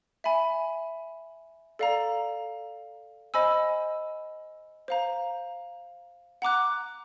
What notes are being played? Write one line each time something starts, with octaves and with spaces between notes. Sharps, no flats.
E5 G#5 B5
A4 D5 F5 A#5
C5 D#5 G#5 B5 E6
C5 F5 A#5
F#5 A#5 D6 F#6